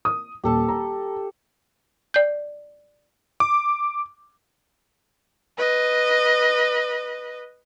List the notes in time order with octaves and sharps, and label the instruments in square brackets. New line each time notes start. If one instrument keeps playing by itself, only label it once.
[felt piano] D#6
[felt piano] D#1 [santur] G4 A4 A5
[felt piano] A#5
[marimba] D5 G6
[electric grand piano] D6
[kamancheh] B4 D#5